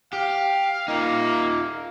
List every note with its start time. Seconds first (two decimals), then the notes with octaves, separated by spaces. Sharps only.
0.13 G4 F5
0.88 A#3 D#4 F4